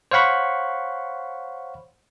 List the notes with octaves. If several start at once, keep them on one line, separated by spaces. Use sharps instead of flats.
C5 C#5 F5 F#5 B5 C#6